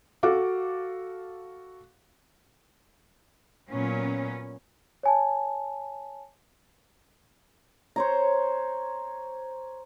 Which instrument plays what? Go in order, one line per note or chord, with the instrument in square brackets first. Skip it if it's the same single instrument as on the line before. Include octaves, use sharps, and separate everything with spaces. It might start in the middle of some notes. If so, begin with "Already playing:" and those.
[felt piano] F#4 A4 F5 D6
[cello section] A#2 F#3 B3 C#4
[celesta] C#5 G#5 A5
[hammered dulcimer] C5 C#5 A#5